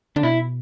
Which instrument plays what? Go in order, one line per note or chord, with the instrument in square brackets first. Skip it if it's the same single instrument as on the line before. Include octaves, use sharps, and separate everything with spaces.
[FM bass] D3 [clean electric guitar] D4
[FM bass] B2 [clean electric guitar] E4